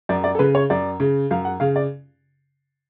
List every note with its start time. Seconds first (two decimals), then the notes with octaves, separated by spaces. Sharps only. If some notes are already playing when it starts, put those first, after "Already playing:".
0.09 F#2 D5
0.24 D5
0.35 A4
0.39 C#3 B4
0.55 C#5
0.70 F#2 D5
1.00 C#3
1.31 F#2 F5
1.45 F#5
1.60 C#3 F5
1.76 D5